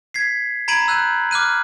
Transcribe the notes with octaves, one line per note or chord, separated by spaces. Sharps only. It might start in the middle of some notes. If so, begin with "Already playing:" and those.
G#6 B6 C7
A#5 B5 G#6 D7 D#7 F#7
E6 F#6 G6 D#7
D6 F6 F#6 D#7